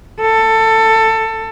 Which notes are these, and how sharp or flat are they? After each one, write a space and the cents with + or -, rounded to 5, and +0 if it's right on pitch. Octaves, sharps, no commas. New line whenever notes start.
A4 +20